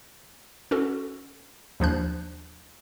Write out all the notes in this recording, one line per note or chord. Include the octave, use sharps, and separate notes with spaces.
C#4 F#4 A4
D#2 F3 D4 F#6